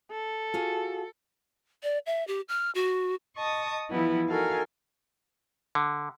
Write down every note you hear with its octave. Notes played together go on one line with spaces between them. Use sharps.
A4
F4 F#4 G#4
D5
E5
G4
F6
F#4
D#5 A5 C#6 D#6
E3 F3 G3 B3 E4
D#4 F#4 A4 A#4 F5 G#5
D3